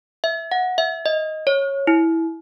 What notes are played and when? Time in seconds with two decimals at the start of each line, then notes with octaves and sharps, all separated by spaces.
0.24 E5
0.52 F#5
0.78 E5
1.06 D#5
1.47 C#5
1.87 E4